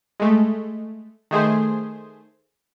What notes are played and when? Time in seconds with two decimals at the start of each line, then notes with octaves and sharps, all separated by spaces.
0.20 G#3 A3
1.31 D#3 A3 G#4 C5